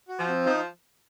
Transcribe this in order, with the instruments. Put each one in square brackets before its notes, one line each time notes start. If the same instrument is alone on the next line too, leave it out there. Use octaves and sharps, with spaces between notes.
[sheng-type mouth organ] F#4
[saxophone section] F3
[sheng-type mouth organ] C4
[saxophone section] F3 [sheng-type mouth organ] D#4